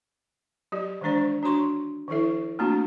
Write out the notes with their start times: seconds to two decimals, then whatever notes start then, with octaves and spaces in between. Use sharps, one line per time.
0.72 F#3 G4 D5
1.01 D#3 E3 G#3 D4 C5 D5
1.43 D4 F#4 C#5 C6 C#6
2.08 D#3 F3 E4 A4 E5
2.59 A3 A#3 C4 D4 F4 F#4